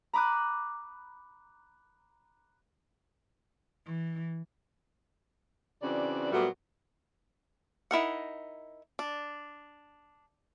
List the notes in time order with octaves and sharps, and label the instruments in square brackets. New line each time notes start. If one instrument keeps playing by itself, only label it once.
[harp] A#5 B5 D6 D#6 F#6
[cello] E3
[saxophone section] C#3 E3 C4 D4 F#4 D5
A#2 F#3 G3 A3 B3 F#4
[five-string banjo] D#4 E4 A#4 F#5
D4